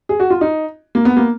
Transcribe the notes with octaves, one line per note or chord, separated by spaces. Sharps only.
G#4
F#4
F4
D#4
A#3
B3
A#3